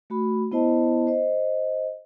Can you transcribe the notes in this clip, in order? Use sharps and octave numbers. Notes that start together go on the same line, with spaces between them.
A3 F#4 B5
B3 E4 C5 D#5 A5
C5 D#5